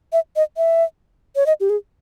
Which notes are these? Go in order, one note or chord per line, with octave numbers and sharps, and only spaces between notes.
E5
D#5
E5
C#5
D#5
G4
G#4